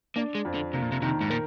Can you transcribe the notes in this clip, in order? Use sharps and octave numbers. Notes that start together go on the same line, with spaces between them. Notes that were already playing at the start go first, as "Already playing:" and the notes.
A#3 D4
G#3
F2
D3
C3 A#3
A#2
C3
C3 D#3
G#2
A#2 A#4